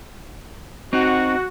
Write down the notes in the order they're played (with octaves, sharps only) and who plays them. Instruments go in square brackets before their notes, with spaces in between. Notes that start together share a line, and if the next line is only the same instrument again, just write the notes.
[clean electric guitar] C4 D#4 [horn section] F#4